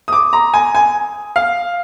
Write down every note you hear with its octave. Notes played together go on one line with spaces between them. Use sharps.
D#6
D6
A#5
G#5
G#5
F5